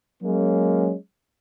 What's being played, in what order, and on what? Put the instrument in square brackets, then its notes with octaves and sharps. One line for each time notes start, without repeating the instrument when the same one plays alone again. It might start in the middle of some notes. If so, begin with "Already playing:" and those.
[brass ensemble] F#3 G#3 A#3 C#4